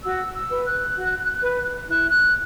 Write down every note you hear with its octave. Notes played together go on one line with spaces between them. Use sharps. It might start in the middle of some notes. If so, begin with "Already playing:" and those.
F#4 E6
E6
B4
F#6
F#4
B4
E4 F#6
F#6